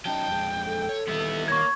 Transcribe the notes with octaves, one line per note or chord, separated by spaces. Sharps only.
F#3 C#4 D#4 G5 A5
F2 G#3
A4
C#5
D#3 G3 B3 E4
A#3 C#5 C#6 G#6